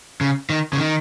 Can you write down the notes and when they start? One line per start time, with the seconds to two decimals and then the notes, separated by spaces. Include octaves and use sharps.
0.21 C#3
0.50 D#3
0.73 C#3
0.78 D#3